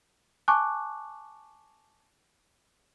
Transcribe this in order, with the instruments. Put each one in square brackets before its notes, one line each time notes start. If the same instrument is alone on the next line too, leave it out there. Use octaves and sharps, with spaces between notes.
[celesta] G#5 A5 C#6 D6 F#6